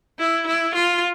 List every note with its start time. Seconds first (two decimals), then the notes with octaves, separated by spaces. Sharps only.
0.19 E4
0.47 E4
0.75 F4